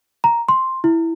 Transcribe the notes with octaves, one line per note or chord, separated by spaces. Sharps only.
A#5
C6
E4